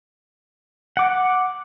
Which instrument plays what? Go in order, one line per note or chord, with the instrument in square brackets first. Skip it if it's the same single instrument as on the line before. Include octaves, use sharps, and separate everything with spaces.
[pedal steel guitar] F#5 D6